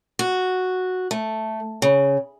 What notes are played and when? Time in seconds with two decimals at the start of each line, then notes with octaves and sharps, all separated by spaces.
0.19 F#4
1.11 A3
1.82 C#3